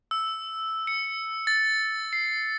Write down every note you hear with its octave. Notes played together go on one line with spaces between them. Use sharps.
E6
C#7
A6
C7